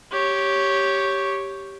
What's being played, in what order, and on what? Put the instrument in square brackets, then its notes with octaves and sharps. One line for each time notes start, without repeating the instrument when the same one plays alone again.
[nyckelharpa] G4 C#5